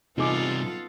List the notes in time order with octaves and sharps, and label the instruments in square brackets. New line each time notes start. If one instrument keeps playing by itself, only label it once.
[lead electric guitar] G2 C3 [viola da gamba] B3 F4 A4 [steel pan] D#4 G#4 D6